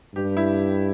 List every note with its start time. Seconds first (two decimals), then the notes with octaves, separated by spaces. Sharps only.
0.15 G2 G4
0.37 E4